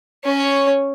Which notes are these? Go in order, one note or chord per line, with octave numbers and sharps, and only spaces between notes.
C#4 C#5